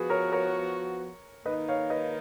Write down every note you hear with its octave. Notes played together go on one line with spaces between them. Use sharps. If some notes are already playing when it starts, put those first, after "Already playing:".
Already playing: F3 B3 F#4 G#4 B4
A#4 C#5
A#4 C#5
D#3 A#3 D#4 B4 D#5
C#5 F5
B4 D#5